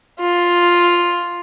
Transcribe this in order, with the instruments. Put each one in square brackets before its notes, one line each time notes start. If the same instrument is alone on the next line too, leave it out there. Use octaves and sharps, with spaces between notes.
[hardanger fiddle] F4